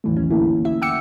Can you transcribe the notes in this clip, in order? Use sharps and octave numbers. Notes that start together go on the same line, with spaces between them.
E2 A2 D#3 E3 F#3 A3
A#1 D#2 C#4
A2 D3 A3 A#3 E4
E4 E5
F#5 G5 D6 E6 C#7